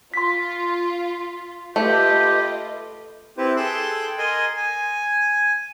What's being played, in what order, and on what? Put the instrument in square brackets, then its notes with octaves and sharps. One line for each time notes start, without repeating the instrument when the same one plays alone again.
[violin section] F4 [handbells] C6 B6
[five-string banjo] A3 [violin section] F4 B4 D#5 [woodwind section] G4
[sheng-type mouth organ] C4 E4 G4 B4 C5
G#4 A4 G5 C6 E6 F#6
A#4 D#5 G#5 C6
G#5